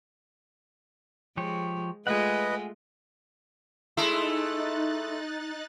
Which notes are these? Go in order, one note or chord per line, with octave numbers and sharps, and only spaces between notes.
F3 G#3 G4 C#5
G#3 A3 F4 B4 D#5 F#5 G#5
G#3 A3 D#4 E4 F#6 A6